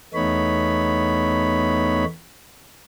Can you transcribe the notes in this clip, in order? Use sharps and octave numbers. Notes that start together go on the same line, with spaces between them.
E2 A3 B3 D#4 C#5 B5